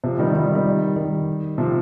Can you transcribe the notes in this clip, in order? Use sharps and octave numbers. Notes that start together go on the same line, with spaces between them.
C3 F3
D#3 G3
D#3 G3
D#3 G3
D#3 G3
C3 F3